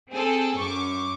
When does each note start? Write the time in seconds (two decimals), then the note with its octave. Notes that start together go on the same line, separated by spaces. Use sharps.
0.10 C4 G#4 A4
0.57 F#2 C#6 D6